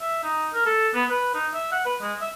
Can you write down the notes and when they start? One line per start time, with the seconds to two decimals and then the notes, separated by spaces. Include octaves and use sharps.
0.01 E5
0.23 D#4
0.54 A#4
0.66 A4
0.94 B3
1.10 B4
1.35 D#4
1.54 E5
1.72 F#5
1.86 B4
2.02 G#3
2.21 E5